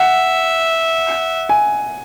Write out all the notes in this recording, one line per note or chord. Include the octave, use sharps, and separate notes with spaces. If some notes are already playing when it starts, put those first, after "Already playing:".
Already playing: E5 F#5
G#5